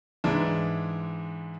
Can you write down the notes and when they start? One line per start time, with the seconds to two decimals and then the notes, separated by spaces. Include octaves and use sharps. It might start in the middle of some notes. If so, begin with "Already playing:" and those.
0.24 G#2 E3 G#3 D4